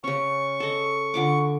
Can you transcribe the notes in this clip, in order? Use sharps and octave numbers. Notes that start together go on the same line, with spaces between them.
C#3 C#4 C#6
A4 D#5
D3 F4 D6